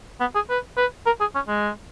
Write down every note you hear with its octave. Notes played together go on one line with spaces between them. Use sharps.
B3
G#4
B4
B4
A#4
G#4
C#4
G#3